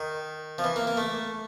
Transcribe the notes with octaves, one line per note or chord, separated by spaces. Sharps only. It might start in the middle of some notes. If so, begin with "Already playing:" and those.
Already playing: D#3
F3
E3
A#3
A#3
A3